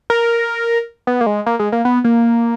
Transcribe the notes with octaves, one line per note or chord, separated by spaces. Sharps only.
A#4
B3
A#3
G#3
A#3
G#3
A#3
B3
A#3